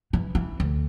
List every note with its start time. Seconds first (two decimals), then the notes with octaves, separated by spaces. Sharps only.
0.13 E3
0.35 E3
0.60 D2